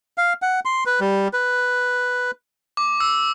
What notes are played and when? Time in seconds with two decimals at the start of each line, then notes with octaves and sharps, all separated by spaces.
0.18 F5
0.42 F#5
0.65 C6
0.86 B4
1.00 G3
1.33 B4
2.77 D6
3.00 E6